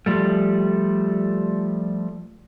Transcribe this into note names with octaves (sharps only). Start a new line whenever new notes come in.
F3 G3 A3